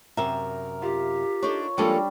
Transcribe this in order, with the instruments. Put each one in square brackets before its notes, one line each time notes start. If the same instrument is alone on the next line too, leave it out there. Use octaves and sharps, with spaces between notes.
[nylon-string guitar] F#2 C3 E5 [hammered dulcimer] A#4
[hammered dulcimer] F4 [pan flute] G4
[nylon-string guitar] D4 D#4 A4 [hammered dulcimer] C#5
[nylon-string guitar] F3 G#3 A#3 [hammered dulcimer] G3 D4 [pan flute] A4